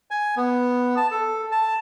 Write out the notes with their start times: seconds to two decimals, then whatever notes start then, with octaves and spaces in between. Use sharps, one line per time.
0.11 G#5
0.37 B3
0.97 A5
1.11 A4
1.52 A5